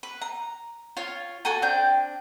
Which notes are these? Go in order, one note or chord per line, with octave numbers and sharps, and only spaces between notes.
B4
A#5
F4 C#5
F#4 A4 G#5 A#5
C4 D4 G5 G6